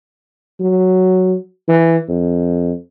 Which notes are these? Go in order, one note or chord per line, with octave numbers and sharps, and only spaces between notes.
F#3
E3
F2